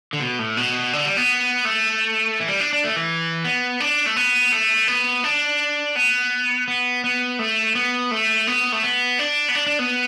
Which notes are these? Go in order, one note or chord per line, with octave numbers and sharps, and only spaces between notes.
D3
B2
A2
B2
D3
G3
B3
A3
E3
G3
D4
D4
A3
E3
B3
D4
A3
B3
A3
B3
D4
B3
B3
B3
A3
B3
A3
B3
A3
B3
D4
B3
D4
D4
B3